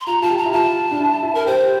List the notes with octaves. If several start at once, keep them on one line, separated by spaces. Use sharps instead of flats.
C6
F4 A#5
F4 A5
G4
A#5
E4
F4 A5
D4
E4
E4
A#4
G4 C5